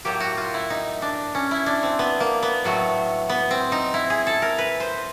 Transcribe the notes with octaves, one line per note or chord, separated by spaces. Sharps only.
A2 F#3 A#3 G4
F#4
F4
E4
D#4
D4
C#4
E4
D4
C4
B3
A#3
B3
A2 F#3 A3
B3
C4
D#4
E4
G#4
A4
A#4
B4
C5